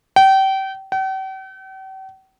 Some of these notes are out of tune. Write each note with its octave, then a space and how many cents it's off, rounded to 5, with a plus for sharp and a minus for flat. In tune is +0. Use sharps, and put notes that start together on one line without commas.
G5 -30
G5 -45